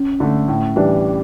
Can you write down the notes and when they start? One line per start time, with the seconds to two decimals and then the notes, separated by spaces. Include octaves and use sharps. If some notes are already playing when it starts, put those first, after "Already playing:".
Already playing: C#4
0.20 D3 A3
0.48 A2
0.76 E3 G3 D4